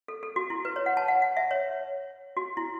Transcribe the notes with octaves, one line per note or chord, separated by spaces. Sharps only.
A4
A4
F#4
E4
B4
C#5
F#5
A5
F#5
F#5
E5
C#5
F#4
E4